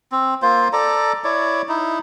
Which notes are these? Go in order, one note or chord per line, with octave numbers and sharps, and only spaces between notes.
C4
A#3 F4 C5
A4 D5 A#5
E4 C#5 D5
D#4 E4